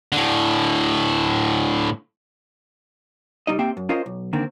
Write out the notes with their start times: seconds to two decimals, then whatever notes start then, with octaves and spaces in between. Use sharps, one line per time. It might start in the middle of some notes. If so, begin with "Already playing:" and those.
0.12 A2 D3
3.47 C2 G3 D#4 D#5
3.59 A#3 C4 G4 E5 G5
3.77 F#2
3.89 C#4 F4 A#4 C5 D#5 F5
4.06 B1
4.33 D3 D#3 A#3 C4